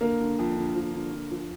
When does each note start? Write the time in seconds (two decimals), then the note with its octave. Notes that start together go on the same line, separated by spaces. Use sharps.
0.01 D3 A#3 A#4
0.20 D3
0.39 F2
0.57 D3
0.75 F3
0.94 D3
1.12 D3
1.31 F3